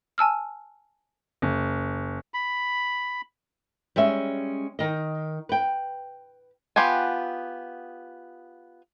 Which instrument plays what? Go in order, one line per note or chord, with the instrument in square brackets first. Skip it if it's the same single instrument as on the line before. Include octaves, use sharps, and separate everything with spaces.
[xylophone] G#5 A5 E6 F6
[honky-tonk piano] F#1
[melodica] B5
[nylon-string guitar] G3 G#3 C#4 E5
D#3 D#5
B4 G5
[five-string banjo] B3 F4 G4 F#5 G#5